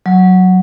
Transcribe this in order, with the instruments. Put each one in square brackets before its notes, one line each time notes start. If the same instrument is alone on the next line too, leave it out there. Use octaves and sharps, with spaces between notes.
[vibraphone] F#3